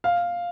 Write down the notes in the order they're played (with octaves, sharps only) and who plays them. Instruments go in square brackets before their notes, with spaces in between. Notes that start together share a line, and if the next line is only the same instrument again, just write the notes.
[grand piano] F5